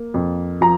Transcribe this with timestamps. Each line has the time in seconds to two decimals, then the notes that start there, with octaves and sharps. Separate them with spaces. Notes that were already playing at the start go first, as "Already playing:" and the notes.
Already playing: A#3
0.14 F2
0.61 F3 A#5